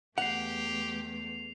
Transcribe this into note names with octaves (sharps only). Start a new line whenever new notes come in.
E2 A3 G4 F#5 C7 F7